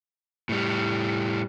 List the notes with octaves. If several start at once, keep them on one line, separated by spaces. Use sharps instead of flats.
A2 G3